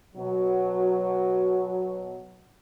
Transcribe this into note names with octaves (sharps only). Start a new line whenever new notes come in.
B2 F#3